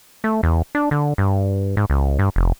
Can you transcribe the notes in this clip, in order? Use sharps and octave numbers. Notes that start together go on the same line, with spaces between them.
A3
E2
D4
D3
G2
G#2
C#2
G2
F1